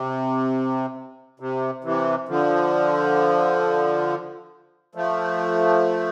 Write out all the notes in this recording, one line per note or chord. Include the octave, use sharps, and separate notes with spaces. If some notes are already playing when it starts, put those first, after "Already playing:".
Already playing: C3
C3
C3 E3
D3 F3
F3 A3